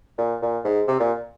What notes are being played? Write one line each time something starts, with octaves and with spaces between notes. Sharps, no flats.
A#2
A#2
G#2
C3
A#2